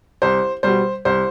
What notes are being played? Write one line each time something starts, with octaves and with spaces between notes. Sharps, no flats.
C2 C5
B2 G3 C5
C2 C5